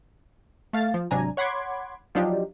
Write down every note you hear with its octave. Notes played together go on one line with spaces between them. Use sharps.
A3 F5 A6
F3
G#1 C3 F#3 D4 G#5 A#5
C#5 F#5 B5 C6 D6 G#6
F3 F#3 D4 D#4 F4 G4